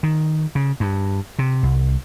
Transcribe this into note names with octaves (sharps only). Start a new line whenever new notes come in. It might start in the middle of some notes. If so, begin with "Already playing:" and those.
D#3
C#3
G2
C3
C2